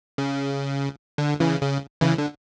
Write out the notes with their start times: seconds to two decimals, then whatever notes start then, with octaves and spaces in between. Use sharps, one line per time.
0.18 C#3
1.18 D3
1.40 C#3 E3
1.62 C#3
2.01 C#3 E3
2.18 D3